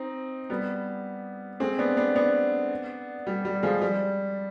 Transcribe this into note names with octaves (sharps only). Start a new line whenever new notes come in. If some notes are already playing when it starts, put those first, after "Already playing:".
Already playing: C4 D#4
G3 B3
G#3 C4
B3 D4
B3 D4
B3 D4
G3
G3
F3 G#3
G3